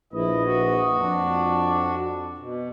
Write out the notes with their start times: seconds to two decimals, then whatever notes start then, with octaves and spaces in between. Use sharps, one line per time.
0.13 A#1 E4 B4 D#5
0.44 F#4
0.96 F2 D4
2.38 B2